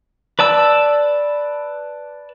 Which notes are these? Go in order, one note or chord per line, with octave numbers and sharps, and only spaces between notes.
B4 D5 A5 E6